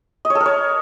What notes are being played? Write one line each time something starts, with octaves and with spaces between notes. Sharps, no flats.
D#5
C#5
A4
A#4
C#5